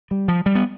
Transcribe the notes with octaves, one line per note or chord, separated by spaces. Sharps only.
G3
F3
G3
B3